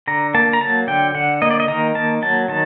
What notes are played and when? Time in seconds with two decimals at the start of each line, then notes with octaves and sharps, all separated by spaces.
0.07 D3 A#5
0.34 A#3 A5
0.53 A#5
0.61 F#3 A5
0.87 D3 G5
1.15 D3 F#5
1.42 A#3 D#5
1.51 D5
1.60 D#5
1.68 D#3 A#5
1.95 A#3 A5
2.22 F#3 A5
2.48 D#3 A5